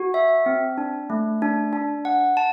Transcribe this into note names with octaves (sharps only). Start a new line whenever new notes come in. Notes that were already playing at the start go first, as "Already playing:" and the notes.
Already playing: F#4
E5
C4
D4
A3
D4
D4
F#5
A5